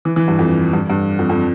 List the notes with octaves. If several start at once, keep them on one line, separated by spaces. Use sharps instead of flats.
E3
E3
G2
F2
G2
G2
F2
F2